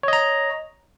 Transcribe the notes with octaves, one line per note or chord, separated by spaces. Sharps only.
C#5 D#5 A#5